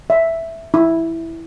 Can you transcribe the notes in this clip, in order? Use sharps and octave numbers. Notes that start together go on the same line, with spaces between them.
E5
E4